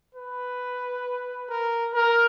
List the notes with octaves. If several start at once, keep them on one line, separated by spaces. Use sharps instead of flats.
B4
A#4
A#4